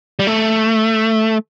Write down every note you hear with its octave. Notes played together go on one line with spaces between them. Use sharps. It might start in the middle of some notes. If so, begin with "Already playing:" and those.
G3
A3